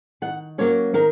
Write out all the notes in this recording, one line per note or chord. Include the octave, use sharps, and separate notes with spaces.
D#3 F#5
F#3 A#3 C#4 C#5
D#3 A#4